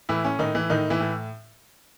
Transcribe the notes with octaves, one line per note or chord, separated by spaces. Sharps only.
A2 E3 E4
C#4
A2 D#3 D#4
E3 E4
A2 D#3 D#4
E3 E4
A2